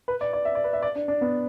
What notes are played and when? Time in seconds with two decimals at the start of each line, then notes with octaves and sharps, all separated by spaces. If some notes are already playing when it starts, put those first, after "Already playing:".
0.08 B4
0.21 D5
0.33 D5
0.45 E5
0.55 D5
0.64 B4
0.73 E5
0.82 D5
0.95 D4
1.08 D4
1.21 B3